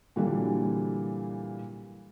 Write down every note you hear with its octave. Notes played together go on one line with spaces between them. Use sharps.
A#2 D3 E3 F#3 G3